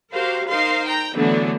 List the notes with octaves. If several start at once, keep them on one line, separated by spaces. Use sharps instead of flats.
F#4 G4 A#4 C5 F5
D#4 A#4 C5 F5 C6
G5 A#5
D3 E3 F#3 A3 B3 D4